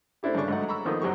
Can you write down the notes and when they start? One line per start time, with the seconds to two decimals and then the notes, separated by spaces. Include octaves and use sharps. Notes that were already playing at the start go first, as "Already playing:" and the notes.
0.23 A3 C4 D4 E4 G4
0.35 G2 C#3 D4 C#6
0.48 G#2 F#3 A3 D#4 F#5
0.69 A#5 B5 C#6 E6
0.85 D3 D#3 F3 A#3 B3
1.02 F#2 F#3 G3 G4 C5 C#6